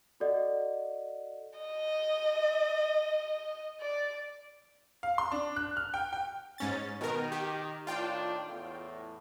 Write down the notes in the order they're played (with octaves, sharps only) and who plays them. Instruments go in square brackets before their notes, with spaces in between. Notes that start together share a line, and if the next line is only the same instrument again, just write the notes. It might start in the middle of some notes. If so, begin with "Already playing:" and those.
[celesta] F#4 A4 D5 D#5 F#5
[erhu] D#5
D5
[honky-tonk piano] F5
C6
D4
F#6
F6
G5
G5
[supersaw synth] G#2 C#4 A6
[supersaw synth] B2 A#4 [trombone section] D#3
[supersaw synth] G4
[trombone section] A2 D#3 D4 [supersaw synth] F4 G5
[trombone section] E2 A2